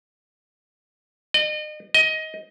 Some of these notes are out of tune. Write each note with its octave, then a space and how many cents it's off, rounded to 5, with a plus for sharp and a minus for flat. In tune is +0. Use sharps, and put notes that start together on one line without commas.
D#5 -40
D#5 +15